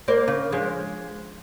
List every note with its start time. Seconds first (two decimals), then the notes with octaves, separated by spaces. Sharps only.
0.08 A#3 C5 D5
0.28 C#3
0.52 F3 G#3